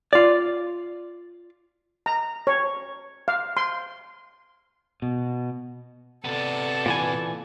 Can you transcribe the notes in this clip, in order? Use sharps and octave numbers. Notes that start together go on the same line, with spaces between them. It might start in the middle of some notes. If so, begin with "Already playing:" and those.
F4 D5
A#5
C#5
F5
C6
B2
C3 B3 A4 D5
A#2 E3 G#5